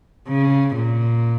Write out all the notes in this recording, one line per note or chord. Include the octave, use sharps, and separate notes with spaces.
C#3
A#2